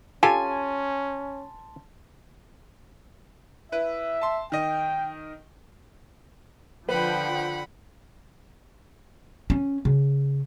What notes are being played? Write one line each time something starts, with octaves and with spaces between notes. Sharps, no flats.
C#4 F4 G4 A4 G#5 A5 C6 A6
E4 B4 E5
A5 C6
D#3 D#5 G5
D3 F3 B4 F#5 G5 B5
C#4
C#3